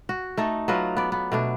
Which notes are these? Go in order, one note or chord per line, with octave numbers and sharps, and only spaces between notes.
F#4
A3 D#4 A4
F#3 F4 B4 D#5
B3 D5
B3
B2 A3 D4